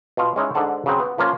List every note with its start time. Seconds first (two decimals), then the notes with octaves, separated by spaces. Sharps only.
0.17 B2 F4
0.36 G#3 C#4 D#4 E4
0.55 G#2 D3 F#5 A5
0.86 C#3 F#3 C4
1.00 B3
1.18 F3 A#3 C#4 F4